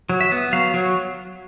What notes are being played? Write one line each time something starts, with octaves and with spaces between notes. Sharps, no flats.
F#3
E5
B3
F#3 F5
F#3